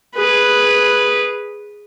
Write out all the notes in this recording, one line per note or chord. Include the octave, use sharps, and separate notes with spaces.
G#4 B4